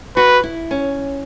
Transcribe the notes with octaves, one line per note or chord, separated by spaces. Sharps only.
F#4 B4
E4
C#4